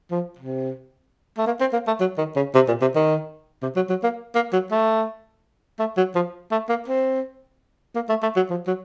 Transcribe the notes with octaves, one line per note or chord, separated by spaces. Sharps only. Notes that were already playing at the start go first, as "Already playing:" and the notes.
F3
C3
A3
A#3
C4
A#3
A3
F#3
D#3
C#3
C3
A#2
C3
D#3
C3
F#3
F#3
A#3
A#3
F#3
A3
A3
F#3
F3
A3
A#3
C4
A#3
A3
A3
F#3
F3
F#3